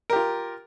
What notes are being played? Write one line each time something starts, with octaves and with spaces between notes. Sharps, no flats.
F4 G4 A#4